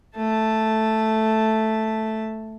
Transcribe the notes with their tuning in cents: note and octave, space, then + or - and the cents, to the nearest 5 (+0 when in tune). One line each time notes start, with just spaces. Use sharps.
A3 +0 A5 +0